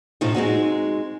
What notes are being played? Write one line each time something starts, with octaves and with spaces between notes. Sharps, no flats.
A2 C3 F3 D#4
G#3 C4 D#4 F#4